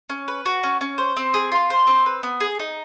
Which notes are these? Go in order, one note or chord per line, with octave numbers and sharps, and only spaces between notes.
C#4
B4
F#4
C#4
C#4
C5
C4
G#4
F4
C5
C4
B4
B3
G#4
D#4